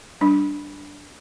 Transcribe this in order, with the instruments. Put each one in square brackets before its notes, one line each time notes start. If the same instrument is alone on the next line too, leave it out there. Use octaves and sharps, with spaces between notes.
[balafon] G3 D4